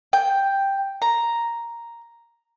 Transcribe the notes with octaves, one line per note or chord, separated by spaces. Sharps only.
G5
A#5